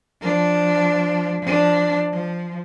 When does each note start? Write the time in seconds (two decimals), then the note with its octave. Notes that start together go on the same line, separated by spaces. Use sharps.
0.21 F3 D4
1.42 F3 D4
2.12 F3